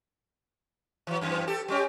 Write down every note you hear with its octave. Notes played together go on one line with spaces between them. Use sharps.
E3 F#3
F#2 E3 C4
G4 A4
G3 C#4 G4